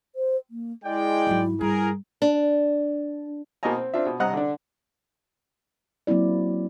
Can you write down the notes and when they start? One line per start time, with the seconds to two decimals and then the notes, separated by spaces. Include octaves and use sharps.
0.15 C5
0.50 A#3
0.84 G#3 E4 D5 G5
1.27 G#2 F#3
1.61 G2 G#4 A#4
2.22 D4
3.63 B2 A#3 C5 D#5 G#5 A#5
3.76 C4
3.94 C4 D4 F4 E5
4.06 B2
4.20 G2 C3 D#5 F#5 A#5 F#6
4.34 D3 D4
6.07 F#3 A#3 C4 E4 D5